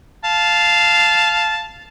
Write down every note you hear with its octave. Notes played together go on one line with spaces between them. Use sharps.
F5 A5